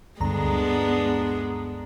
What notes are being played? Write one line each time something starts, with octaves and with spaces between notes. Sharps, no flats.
D2 G2 G#3 B3 D4 A#5